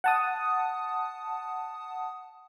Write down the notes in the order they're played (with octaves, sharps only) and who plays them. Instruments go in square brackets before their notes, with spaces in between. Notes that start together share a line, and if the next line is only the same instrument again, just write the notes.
[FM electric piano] F#5 A5 D#6